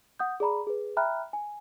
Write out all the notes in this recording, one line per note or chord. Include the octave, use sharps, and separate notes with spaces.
F#5 D#6 G6
G#4 D5 A#5 B5
G#4 B4
E5 G5 A#5 B5 F6 F#6
G#5